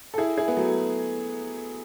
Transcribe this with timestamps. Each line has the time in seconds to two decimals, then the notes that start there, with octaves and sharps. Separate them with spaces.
0.14 A4
0.18 E4 G#4
0.37 E4 G#4
0.48 B3
0.57 F#3 A3